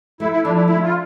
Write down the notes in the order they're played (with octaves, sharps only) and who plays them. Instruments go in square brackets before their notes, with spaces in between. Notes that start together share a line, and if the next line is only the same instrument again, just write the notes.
[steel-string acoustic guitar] A3 [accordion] E4
[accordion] E4
[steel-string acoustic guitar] F3 [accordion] D4
[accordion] E4
[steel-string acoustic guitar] D3 [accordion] E4
[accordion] F4